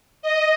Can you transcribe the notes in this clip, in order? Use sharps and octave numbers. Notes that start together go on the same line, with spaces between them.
D#5